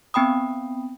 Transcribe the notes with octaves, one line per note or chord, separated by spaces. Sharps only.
B3 C4 G5 B5 D#6